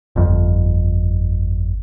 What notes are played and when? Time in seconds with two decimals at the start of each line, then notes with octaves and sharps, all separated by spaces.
0.16 G1 F2